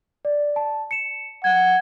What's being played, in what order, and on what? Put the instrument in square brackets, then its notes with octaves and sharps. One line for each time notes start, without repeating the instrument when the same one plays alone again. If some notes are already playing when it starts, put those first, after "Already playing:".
[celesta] D5
A5
C#7 E7
[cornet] F#5 [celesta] G#6